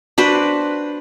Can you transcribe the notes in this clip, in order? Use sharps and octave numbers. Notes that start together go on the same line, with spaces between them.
D4 F#4 B4 C5